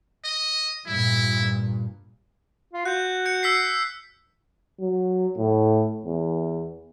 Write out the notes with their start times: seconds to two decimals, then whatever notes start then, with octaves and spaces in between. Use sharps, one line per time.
0.24 D#5
0.87 G2 A#2 E4
2.73 F4
2.85 F#4 F#6 G6
3.26 G6 C#7
3.43 E6 B6 C7
4.81 F#3
5.38 A2
6.05 E2